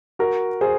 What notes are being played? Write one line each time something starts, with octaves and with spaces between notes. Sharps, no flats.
F#4 A#4
G#4 C5